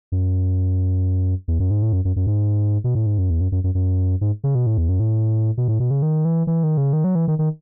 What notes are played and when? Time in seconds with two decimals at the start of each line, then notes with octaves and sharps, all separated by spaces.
0.12 F#2
1.48 E2
1.60 F#2
1.71 G#2
1.82 A2
1.93 F#2
2.05 F#2
2.16 F#2
2.27 G#2
2.84 B2
2.95 A2
3.06 G#2
3.18 F#2
3.30 E2
3.41 F#2
3.52 F#2
3.64 F#2
3.75 F#2
4.21 G#2
4.44 C#3
4.55 B2
4.66 A2
4.78 E2
4.89 F#2
5.00 A2
5.57 B2
5.68 A2
5.80 B2
5.91 C#3
6.02 D#3
6.25 E3
6.47 E3
6.63 D#3
6.77 C#3
6.93 D#3
7.04 F#3
7.15 E3
7.28 D#3
7.39 D#3